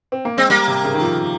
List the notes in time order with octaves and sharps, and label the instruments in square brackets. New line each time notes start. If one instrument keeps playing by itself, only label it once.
[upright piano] C4
A#3
[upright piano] G#3 [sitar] C4
[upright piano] G3 [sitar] A#3
[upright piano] C3
C#3
D#3
F3